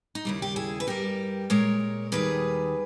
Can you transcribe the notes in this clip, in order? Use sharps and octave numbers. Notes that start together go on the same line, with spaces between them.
D#4
D#2 C#3 G3 E4
G4
E4 G#4
B4
G2 G3 G4 A#4
A#2 G#3 A#4 C#5
D#2 D#3 G3 G#4 B4